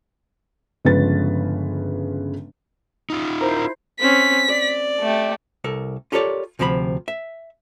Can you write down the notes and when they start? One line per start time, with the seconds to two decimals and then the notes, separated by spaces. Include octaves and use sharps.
0.85 G1 C#3 F3 G#3 B4 A6
3.10 D#4 F4
3.41 E4 A#4 C5
4.00 C4 C#4 B6
4.49 D5
5.00 A3 G4
5.64 C2 A4 A#4
6.12 F4 G4 A4 A#4 C#5 D5
6.59 D2 C3 F3 A4 B5
7.08 E5